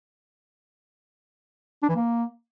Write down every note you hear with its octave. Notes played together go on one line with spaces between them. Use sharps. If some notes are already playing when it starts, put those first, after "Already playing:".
D4
E3
A#3